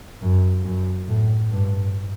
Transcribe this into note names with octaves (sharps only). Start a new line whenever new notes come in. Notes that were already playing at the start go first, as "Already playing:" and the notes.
F#2
F#2
A2
G2